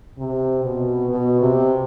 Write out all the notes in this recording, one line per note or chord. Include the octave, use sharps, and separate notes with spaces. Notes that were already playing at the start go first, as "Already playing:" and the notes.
C3
B2
B2
C3